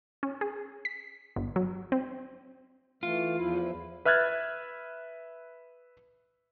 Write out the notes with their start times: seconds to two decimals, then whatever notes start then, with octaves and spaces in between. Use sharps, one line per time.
0.23 C#4
0.41 G#4
0.85 B6
1.36 G1
1.56 F#3
1.92 C4
3.03 E3 A3 F4
3.37 E2 F3 E4
4.05 B4 E5 F6 F#6 G#6 A6